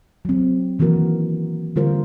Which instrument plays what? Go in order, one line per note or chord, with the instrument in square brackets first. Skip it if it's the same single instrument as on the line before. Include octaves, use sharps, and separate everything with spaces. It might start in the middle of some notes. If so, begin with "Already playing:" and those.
[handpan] F#3 C4
D#3 E3 A#3 F#4 A#4
D3 G3 F4 A#4 C5